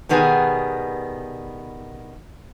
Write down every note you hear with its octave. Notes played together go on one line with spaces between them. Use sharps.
B2 D#3 G3 B3 D#4 G#4